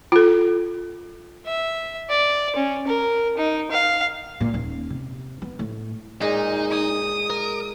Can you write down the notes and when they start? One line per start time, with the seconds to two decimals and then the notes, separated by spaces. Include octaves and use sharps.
0.12 F4 A4
1.46 E5
2.09 D5
2.56 C#4
2.88 A#4
3.38 D#4
3.71 F5
4.40 A#2
4.54 D#1
4.90 C3
5.42 B3
5.59 A2
6.21 A#2 G#3 D#4
6.72 G#5 D#6
7.30 A#4